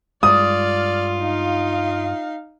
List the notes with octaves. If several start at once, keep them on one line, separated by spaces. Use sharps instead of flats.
G2 G#3 F4 D5 D#6 F6
D#4 F5